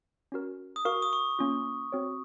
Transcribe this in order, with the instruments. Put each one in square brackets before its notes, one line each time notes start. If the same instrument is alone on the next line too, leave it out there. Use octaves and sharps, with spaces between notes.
[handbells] C#4 F#4 A#4
[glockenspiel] D#6
[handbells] F#4 A#4 F5 [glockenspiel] C#6
[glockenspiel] D#6
C#6
[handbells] A#3 C#4 F4
C4 F#4 C#5